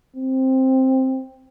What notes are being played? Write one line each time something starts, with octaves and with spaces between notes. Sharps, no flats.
C4